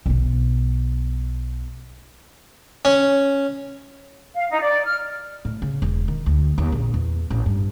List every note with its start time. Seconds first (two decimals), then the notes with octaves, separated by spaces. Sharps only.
0.06 B1 B3
2.85 C#4
4.36 F5
4.50 D#4
4.62 D5
4.85 F6
5.45 A2
5.62 C#3
5.82 E1
6.08 D#3
6.26 D2
6.58 D#2
6.72 A#1
6.94 E2
7.30 A1
7.46 G2